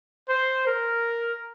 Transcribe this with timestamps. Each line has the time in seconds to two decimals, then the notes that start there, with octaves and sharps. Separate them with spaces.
0.29 C5
0.67 A#4